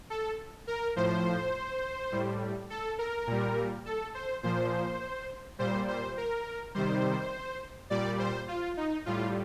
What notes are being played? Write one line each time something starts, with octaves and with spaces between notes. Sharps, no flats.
A4
A#4
A2 F3 C5
A2 G3
A4
A#4
A#2 G3
A4
C5
A#2 F3 C5
A#2 G3 C5
C5
A#4
C3 D#3 G3 C5
A#2 G3 D5
C5
F4
D#4
A2 G3 F4